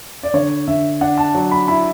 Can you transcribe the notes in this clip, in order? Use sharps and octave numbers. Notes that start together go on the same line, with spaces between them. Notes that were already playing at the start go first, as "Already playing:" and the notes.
D5
D3 C#5
D3 E5
D4 F#5
A5
F#3
B5
E4 B5